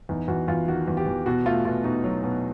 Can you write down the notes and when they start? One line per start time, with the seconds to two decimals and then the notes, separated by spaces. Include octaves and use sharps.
0.09 E2 D#4
0.28 E2 F#4
0.48 E2 F4
0.67 D#3 F#4
0.88 E2
0.97 G4
1.06 E2
1.26 B2 F#4
1.46 A3 F4
1.65 B2 F4
1.84 B2 D#4
2.04 F#3
2.23 B2